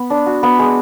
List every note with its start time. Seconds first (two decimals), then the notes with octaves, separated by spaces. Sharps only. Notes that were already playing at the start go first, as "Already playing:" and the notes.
Already playing: B3
0.10 D4
0.26 F#4
0.43 B3
0.59 G#3